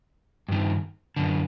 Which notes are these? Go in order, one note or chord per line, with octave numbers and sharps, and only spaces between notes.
G2 D#3
F#2 D3